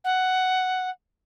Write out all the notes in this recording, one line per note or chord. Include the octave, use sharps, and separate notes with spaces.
F#5